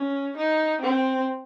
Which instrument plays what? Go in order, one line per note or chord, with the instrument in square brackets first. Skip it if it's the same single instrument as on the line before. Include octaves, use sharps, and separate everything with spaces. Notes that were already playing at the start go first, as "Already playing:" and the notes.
Already playing: [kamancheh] C#4
D#4
C4